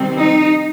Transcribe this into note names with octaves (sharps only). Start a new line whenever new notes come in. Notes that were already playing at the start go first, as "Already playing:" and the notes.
Already playing: C3 D#3 G3 C4
D#4